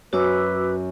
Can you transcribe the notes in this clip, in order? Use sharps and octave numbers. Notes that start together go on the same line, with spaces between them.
F#2 F#4 B4 D6 E6